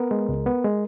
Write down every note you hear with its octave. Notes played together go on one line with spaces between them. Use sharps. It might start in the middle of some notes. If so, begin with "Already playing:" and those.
Already playing: B3 A#4
G#3
C#2
B3
G#3